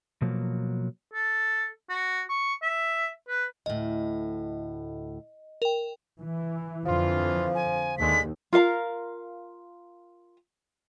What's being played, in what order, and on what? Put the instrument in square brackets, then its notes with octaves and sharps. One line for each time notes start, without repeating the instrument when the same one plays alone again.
[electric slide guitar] B2 F3 F#3 A#3
[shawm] A4
F#4
C#6
E5
B4
[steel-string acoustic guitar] D2 A2 [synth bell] D#5
[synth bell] A#4 G5
[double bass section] E3
[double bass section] F2 D3 [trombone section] E3 F4 [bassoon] F3
[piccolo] G#5
[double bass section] D#2 [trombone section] D3 G#3 A3 [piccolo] B6
[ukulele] F4 A#4 F5 A#5